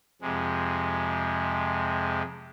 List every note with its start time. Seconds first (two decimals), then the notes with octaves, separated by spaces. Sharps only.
0.22 F2 C3 G#3